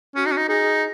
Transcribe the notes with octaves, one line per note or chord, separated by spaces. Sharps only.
C#4 F#4
D#4
C#4
D#4
D#4 G#4